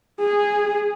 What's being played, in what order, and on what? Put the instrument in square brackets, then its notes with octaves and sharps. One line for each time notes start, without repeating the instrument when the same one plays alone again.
[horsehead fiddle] G#4